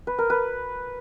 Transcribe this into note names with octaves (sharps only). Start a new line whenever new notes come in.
B4
A#4
B4